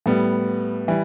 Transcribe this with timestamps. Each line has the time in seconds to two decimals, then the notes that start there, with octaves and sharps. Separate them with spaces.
0.06 A2 G3 B3
0.88 E3 G3